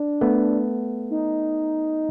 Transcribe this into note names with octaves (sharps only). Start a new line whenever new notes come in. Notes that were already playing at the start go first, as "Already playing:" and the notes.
Already playing: D4
A3 B3
D#4